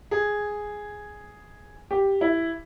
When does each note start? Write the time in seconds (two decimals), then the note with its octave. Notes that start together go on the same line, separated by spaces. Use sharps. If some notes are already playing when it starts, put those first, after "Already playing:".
0.11 G#4
1.91 G4
2.21 E4